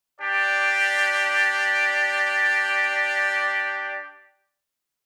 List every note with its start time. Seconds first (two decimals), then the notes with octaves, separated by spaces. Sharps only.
0.20 D4 G4 D5